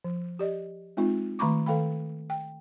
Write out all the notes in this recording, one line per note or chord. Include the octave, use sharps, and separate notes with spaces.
F3
G4 D5 D#5
G#3 C4 D#4 F4
D#3 A3 A#5 B5 C#6 D6
D#3 A4 F5 G5 B5
G5